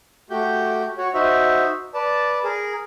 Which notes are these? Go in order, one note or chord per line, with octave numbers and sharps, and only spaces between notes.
A3 F#4 G4 G6
F#4 C#5
D#4 F#4 C5 E5
B4 D5 A5
G#4 A#4